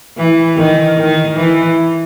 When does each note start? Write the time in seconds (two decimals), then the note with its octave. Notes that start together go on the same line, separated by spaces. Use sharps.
0.17 E3
0.57 D#3
0.97 D#3
1.36 E3